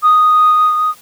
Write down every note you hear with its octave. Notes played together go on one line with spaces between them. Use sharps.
D#6